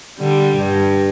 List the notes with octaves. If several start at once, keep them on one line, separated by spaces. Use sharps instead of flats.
D3 G3
G2